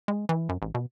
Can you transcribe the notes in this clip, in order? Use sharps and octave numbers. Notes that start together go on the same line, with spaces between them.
G#3
E3
F#2
A1
B2